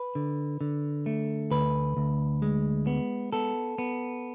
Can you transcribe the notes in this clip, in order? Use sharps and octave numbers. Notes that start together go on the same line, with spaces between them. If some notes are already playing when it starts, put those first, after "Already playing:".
Already playing: B4
D3
D3
A3
D2 B4
D2
G#3
B3
B3 A4
B3